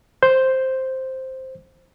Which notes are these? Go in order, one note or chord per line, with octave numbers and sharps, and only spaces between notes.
C5 G6